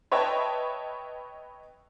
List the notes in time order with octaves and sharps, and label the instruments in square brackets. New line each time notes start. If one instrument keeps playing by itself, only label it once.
[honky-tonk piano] B4 C#5 D#5 E5 G5 A5